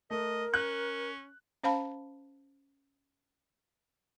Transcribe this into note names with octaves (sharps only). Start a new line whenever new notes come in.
A3 A#4 D#5
C#4 F#6
C#4 C5 F5 A5 B5